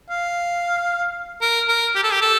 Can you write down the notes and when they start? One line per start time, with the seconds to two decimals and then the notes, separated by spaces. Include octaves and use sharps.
0.10 F5
1.42 A#4
1.68 A#4
1.95 G4
2.03 A4
2.12 G4
2.21 A4